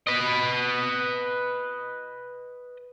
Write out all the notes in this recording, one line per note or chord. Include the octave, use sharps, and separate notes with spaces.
B4 D#5